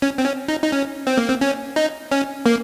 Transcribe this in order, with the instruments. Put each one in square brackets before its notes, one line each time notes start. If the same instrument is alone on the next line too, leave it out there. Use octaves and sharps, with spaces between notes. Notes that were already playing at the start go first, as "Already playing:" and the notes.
[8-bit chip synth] C#4
C4
C#4
D#4
D#4
C#4
C4
A#3
C4
C#4
D#4
C#4
A#3